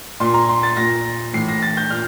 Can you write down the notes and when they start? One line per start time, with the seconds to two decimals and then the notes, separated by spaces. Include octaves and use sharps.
0.20 A#2 C6
0.34 A#5
0.49 C6
0.63 A6
0.77 A#2 A#6
1.33 A2 E3 C7
1.49 A#6
1.62 A6
1.77 G6
1.90 A#2 F6